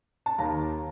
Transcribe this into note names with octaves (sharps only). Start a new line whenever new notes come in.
A5
D#2 D#3 A#5